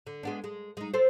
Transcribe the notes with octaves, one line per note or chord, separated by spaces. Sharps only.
D3
G#3 B3 D4
G#3
G#3 D#4
C4 A4 C5